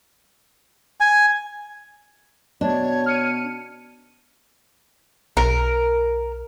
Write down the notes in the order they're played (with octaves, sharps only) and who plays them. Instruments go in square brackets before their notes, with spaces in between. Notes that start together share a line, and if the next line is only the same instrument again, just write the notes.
[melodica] G#5
[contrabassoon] B2 [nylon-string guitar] D4 [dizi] C#5
[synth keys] F6 C#7 D#7
[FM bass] B1 [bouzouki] A#4